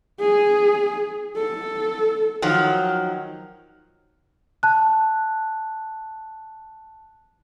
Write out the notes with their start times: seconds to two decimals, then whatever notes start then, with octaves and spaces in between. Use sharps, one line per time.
0.20 G#4
1.36 A4
2.42 D#3 F3 F#3
4.63 A5 F#6